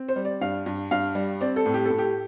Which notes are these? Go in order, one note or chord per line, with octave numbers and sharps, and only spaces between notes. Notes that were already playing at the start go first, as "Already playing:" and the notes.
Already playing: C4
C5
G3
D5
G2 F5
G2
G2 F5
G3
C4 D5
A4
A2
G4
A2 A4
G4